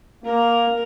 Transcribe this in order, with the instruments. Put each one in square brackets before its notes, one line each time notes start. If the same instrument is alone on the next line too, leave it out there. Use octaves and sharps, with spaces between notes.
[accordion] A#3 [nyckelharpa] A#4